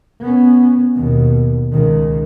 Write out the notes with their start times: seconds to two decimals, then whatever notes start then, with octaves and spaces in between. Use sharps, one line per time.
0.21 B3 C#4
0.95 D#2 B2
1.72 C#2 D#3